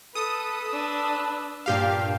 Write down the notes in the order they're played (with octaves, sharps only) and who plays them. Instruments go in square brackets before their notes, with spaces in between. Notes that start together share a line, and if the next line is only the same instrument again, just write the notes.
[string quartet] A4 [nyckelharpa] B4 [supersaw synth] D#6
[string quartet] D4 E6
[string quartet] G2 D4 [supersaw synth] A#2 G4 F5